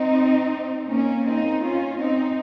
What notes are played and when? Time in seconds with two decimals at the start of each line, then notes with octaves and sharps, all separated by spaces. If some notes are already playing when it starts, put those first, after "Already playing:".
Already playing: C4 D#4
0.90 A#3 C#4
1.26 C4 D#4
1.63 C#4 F4
1.99 C4 D#4